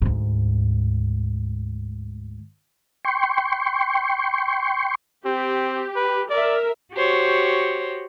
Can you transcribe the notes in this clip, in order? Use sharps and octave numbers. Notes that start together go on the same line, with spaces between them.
D2 G#2
G5 C6 C#6
C4 G4
B4
A#4 D5 E5
F#4 G4 C5 C#5